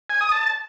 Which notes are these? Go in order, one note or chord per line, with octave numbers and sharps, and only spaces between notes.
G#5
D#6
A5